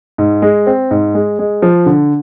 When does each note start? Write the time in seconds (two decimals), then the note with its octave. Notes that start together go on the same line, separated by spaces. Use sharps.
0.18 G#2
0.42 G#3
0.67 C4
0.91 G#2
1.15 G#3
1.39 G#3
1.62 F3
1.86 D3